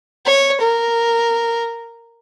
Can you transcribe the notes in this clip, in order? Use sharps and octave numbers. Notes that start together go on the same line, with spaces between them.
C#5
A#4